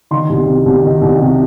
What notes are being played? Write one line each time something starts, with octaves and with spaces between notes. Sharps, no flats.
D#3 C6
C2
C3
C2
D#3
C2
C3